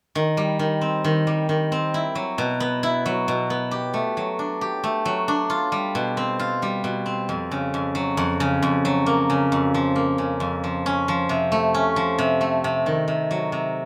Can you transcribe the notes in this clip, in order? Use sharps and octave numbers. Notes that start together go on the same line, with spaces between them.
D#3
G3
D#3
C4
D#3
G3
D#3
C4
E4
F#3
B2
B3
E4
F#3
B2
B3
G4
A3
F#3
D4
G4
A3
F#3
D4
F4
G3
B2
C4
F4
G3
B2
C4
F2
C#3
F2
F#3
F2
C#3
F2
F#3
A#3
C#3
F2
F3
A#3
C#3
F2
F3
C#4
F3
C3
A3
C#4
F3
C3
A3
C3
D#3
C3
F#3
C3